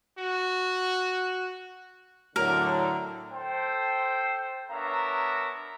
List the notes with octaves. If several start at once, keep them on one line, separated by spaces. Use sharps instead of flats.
F#4
A2 D3 F#3 A#4
A4 C5 G5
B3 D4 A#4 C#5 E5 A#5